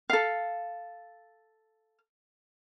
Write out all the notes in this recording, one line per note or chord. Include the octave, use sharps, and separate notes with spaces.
A4 F5